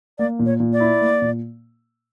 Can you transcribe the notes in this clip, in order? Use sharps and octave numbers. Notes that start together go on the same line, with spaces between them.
A#3 D5
A#2
C#5
A#2
D5
E4
A#3
A#2